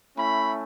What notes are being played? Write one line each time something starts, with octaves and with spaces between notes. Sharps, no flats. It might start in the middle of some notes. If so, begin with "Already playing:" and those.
A3 C#4 E4 B5